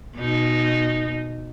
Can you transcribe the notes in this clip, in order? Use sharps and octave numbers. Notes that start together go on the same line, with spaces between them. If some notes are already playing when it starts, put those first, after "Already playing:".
B2 D#4